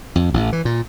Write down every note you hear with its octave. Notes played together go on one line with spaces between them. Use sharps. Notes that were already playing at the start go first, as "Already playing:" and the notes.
F2
A1
E3
A#2